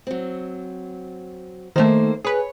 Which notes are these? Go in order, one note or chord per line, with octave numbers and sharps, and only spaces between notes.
F#3 C4
D#3 A3 A#3 C5
G#4 B4 C#5